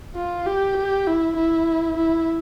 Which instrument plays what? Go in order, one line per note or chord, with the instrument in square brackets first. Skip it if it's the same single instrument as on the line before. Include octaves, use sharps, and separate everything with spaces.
[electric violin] F4
G4
G4
E4
E4
E4